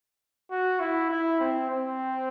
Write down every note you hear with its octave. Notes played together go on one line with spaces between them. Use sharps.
F#4
E4
E4
C4
C4